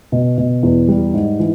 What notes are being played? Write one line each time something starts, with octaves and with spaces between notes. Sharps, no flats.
B2
B2
E2
G3
G#2
E3